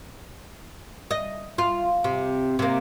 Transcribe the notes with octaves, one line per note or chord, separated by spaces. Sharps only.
D#5
F4
C3
C3 A#3